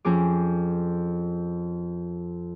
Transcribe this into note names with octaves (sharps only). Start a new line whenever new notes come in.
F2 C#4 G#4 D6